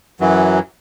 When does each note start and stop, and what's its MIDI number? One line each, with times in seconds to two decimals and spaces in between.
0.20 0.59 42
0.20 0.59 52
0.20 0.59 54